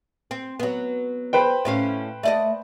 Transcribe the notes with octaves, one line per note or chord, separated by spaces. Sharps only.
C4
F#3 B3
B4 C5 G5
A2 C#4 F5
A3 D5 D#5